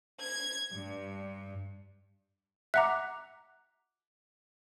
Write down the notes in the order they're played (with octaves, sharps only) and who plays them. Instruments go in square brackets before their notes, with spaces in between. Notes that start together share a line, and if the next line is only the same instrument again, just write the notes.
[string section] G#6
G2
[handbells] E5 F#5 A#5 [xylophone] D6 F#6